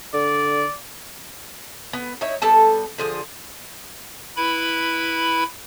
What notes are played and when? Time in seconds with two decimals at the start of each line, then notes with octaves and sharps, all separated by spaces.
0.14 D3 D5
1.93 B3
2.21 D#4 E4 C#5
2.42 G3 B3 A4 A5
2.98 D3 F3 G#4
4.37 E4 B4 B5